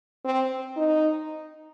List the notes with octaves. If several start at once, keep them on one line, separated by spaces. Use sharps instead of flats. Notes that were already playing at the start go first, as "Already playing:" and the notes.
C4
D#4